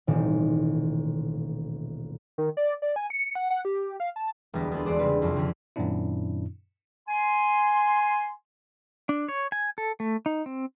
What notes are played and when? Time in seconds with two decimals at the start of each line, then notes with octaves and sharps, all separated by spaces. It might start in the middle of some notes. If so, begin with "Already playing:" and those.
0.07 D#1 A1 B2 D#3 C4 A6
2.38 D#3
2.57 D5
2.82 D5
2.96 G#5
3.10 C#7
3.35 F#5
3.50 F#5
3.65 G4
4.00 F5
4.16 A5
4.54 E1 D2 G3 B3 A#6
4.72 B3 C4 G#4 A4
4.86 E2 G#3 D4 C5 D5
4.99 C#3 G3 C4 B4
5.22 C2 F2
5.36 D3 C#4 G4 G#4 C#5
5.76 F#2 A#2 D#3 C4 D4 E4
7.08 G#5 C6
9.09 D4
9.29 C#5
9.52 G#5
9.78 A4
10.00 A3
10.26 D#4
10.46 C4